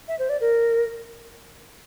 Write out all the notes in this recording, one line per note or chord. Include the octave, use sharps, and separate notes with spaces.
E5
C5
D5
A#4